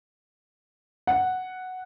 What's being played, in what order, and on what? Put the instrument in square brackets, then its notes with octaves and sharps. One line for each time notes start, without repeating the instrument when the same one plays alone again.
[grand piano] F#5